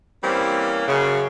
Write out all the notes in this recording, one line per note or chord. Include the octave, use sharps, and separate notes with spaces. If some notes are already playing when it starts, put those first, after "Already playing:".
E3 G3 A#3 C4 C#4
F#2 C#3